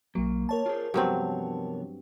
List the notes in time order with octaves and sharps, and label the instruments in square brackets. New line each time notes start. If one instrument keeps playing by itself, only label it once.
[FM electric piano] B1 F#3 [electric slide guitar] A#3
[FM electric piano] A#4 C#5 A5
[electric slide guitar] F4 G#4 C5
[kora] G2 F#3 C4 [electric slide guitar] C3 F3 B3